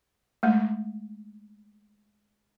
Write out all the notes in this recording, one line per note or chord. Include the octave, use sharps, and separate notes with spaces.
G#3 A3